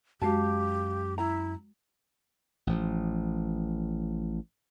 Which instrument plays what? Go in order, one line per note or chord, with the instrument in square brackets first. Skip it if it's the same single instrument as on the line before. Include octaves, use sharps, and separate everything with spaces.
[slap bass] F#2 [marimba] G#3 F#4 [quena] G4 [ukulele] F5 A5
[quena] E4 [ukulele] A#5
[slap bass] A1 F3